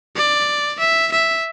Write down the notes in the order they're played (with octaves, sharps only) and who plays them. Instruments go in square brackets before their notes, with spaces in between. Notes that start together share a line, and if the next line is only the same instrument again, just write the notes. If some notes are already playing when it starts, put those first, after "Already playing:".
[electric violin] D5
E5
E5